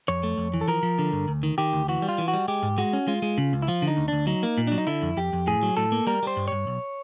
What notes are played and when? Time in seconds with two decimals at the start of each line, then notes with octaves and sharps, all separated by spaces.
0.08 F2 C#5
0.23 A3
0.38 F2
0.54 E3
0.61 A4
0.68 F3 A#4
0.83 F3
0.99 D3
1.13 G2
1.28 D2
1.43 D#3
1.58 D#3 G4
1.73 D2
1.88 E3 F#4
2.02 G3
2.09 F4
2.18 E3
2.28 F#4
2.33 G3
2.48 G#3 G4
2.63 G#2
2.78 G#3 F#4
2.93 C#4
3.08 G#3 F4
3.22 G#3
3.38 C#3
3.53 C#2
3.62 E4
3.68 F3 F4
3.82 D3
3.87 D#4
3.97 D2
4.08 D2 D4
4.27 F#3 D#4
4.43 A#3
4.58 A#2
4.67 F#3 D4
4.78 D#4
4.87 D3 E4
5.02 F2
5.17 F2 G4
5.33 F2
5.47 A2 G#4
5.63 F#3
5.77 A2 A4
5.92 A#3
6.07 G3 A#4
6.23 G3 C5
6.37 G2
6.48 G2 C#5
6.67 B1